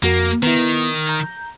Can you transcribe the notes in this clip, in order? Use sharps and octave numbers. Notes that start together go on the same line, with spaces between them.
F2 A#3 F#4 A#4
D#3 B3 E4
A#5 G6